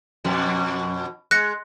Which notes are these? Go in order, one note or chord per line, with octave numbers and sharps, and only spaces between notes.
F2 B2
G#3 F#6 A#6 C#7